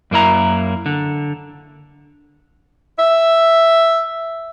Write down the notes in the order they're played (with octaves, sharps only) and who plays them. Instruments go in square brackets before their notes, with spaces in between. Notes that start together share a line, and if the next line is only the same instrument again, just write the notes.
[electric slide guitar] F#2 A#3 E4 A#5
D3
[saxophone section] E5